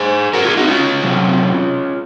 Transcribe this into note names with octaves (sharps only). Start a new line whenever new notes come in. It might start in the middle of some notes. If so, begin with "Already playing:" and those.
Already playing: G#4 C5
F#4 A#4
F4 G#4
D#4 F#4
C#4 F4
C3 F#3